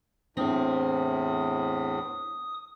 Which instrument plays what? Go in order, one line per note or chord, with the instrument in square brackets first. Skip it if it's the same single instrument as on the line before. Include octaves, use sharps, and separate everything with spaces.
[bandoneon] E2 A2 [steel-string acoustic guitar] C4 [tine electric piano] D4 C5 [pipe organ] D#6